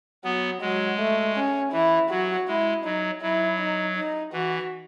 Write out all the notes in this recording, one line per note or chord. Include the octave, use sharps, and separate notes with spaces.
F#3 B3
F#3 G#3
A3
C#4
E3 E4
F#3 F#4
G#3 E4
F#3 D#4
F#3 E4
D#4
D#4
E3 F#4